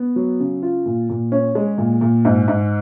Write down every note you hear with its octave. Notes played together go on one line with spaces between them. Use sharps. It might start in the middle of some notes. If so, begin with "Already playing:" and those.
Already playing: B3
F#3
C#3
F4
A#2
A#2
C#4
G#3
A#2
A#2
G#2
G#2